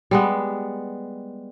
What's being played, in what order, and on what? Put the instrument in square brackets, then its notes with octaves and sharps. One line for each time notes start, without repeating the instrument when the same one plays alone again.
[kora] G3 G#3 B3